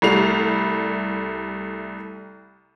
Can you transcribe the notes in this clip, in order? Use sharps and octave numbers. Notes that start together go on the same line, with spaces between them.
C2 G3 A3 C7 F7